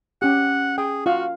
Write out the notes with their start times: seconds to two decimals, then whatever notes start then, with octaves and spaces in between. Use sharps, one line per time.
0.22 C#4 G4 F#5
0.78 G#4 G5
1.06 F4 F#4 F5